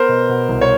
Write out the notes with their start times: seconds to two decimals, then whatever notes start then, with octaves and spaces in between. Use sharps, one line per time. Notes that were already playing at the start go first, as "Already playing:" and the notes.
Already playing: B3 A#4 C5
0.09 B2
0.29 B2
0.48 C2
0.61 C#5